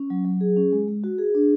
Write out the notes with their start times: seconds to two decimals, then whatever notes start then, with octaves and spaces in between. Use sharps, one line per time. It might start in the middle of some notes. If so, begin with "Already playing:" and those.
Already playing: C#4
0.10 F#3
0.25 F#3
0.41 G#4
0.57 C#4
0.72 G#3
0.88 G#3
1.04 F#4
1.18 G#4
1.35 D4